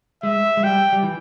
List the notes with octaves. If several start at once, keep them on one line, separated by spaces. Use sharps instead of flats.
G#3 E5
G#3
G3 G5
G3
E3